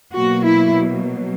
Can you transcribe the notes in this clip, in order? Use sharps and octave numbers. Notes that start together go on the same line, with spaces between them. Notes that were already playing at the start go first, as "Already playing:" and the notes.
B2 F#3 A#3 F#4
E4